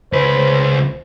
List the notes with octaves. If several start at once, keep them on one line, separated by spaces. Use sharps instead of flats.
C#2 B4 C5